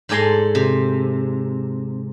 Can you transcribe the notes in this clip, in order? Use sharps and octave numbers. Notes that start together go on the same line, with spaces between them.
G#2 A4 D5 G#5 A#5 C6
C3